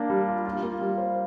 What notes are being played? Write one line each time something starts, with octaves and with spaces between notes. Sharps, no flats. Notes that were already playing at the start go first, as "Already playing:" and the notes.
Already playing: A#3 D4
G3
F4
F4
A#3
G3
C5